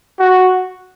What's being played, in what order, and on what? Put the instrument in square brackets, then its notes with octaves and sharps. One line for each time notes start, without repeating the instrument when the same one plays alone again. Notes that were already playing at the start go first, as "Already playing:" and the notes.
[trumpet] F#4